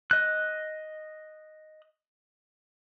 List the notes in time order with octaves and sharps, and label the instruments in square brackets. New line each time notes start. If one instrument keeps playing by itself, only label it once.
[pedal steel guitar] D#5 F#6